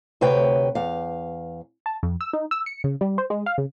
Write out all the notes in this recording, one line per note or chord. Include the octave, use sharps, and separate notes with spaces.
D2 C3 B4 C#5 G5
E2 F5
A5
F2
E6
D#4
E6
C#7
C#3
G3
C5
G#3
F5
C#3